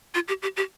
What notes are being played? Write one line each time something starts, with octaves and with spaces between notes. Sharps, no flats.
F4
G4
G4
G4